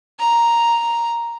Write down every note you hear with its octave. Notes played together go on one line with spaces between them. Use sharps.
A#5